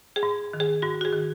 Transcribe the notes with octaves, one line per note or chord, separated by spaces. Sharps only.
G#4
G#2
D#3
G#4
G#2 F#4
F#4
G#4
D#3